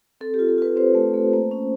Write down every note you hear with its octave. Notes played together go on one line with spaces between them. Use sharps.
C4 A4
G4
F4
A4
F4 B4
C4 C5
A3
A3
A#3
C#4